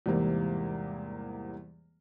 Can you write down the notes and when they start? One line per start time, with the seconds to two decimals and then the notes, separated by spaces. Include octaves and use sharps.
0.06 E2 G#2 C3 E3 G3 A#3